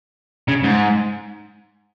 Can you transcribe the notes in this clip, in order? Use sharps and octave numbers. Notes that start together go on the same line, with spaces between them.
C#3
G#2